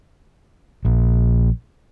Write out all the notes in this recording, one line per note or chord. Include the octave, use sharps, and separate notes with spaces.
A#1